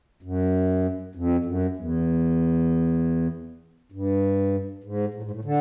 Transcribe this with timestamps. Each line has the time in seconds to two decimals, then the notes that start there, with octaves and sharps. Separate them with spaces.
0.23 F#2
1.15 F2
1.45 F#2
1.77 E2
3.92 G2
4.84 G#2
5.14 A2
5.23 G#2
5.31 A2
5.45 D3